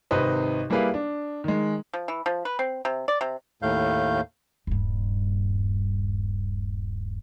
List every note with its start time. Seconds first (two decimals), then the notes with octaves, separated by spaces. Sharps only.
0.11 G#1 C3 D#4 B4 C5 D#5
0.70 G3 A#3 E4 G#4 B4 F5
0.94 D4
1.44 D#3 G#3
1.93 F3
2.08 E3
2.26 F3
2.45 B4
2.59 C4
2.85 C3
3.08 D5
3.21 C3
3.62 D#2 A2 A3 F5 G6
4.67 D#1 G2